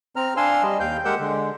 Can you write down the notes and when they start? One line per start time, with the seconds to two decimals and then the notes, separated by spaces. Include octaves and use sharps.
0.16 C4 A#5 F6
0.37 D4 F5 G#5 C6 E6
0.63 G3 D#5
0.80 D#2 F5 G5 G6
1.05 G#3 G4 A#4 F#5 E6 G6
1.19 D3 G#3